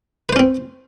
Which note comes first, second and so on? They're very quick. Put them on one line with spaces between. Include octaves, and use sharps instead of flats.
B4 C5 C#4 C4